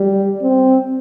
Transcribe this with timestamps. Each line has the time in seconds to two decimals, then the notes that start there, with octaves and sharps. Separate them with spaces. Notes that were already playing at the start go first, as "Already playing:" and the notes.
Already playing: G3
0.43 C4